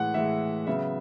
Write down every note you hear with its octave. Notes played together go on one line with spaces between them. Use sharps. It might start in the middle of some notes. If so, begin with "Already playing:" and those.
Already playing: A2 E3 G#3 F#5
A2 E3 G#3 E5
C#3 F#3 B3 E5